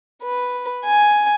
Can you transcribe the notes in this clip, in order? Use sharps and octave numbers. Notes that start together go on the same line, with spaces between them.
B4
G#5